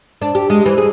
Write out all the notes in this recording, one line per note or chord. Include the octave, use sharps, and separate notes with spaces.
D4
G4
G#3
E3
G#4